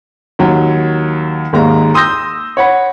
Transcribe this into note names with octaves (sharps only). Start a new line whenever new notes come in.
D#2 F#3
G#1 D#2 G#3 A#3 A#5
C6 D#6 E6 G6 A#6
C#5 F#5 B5